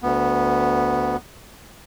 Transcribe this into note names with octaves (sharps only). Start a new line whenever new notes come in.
D2 B3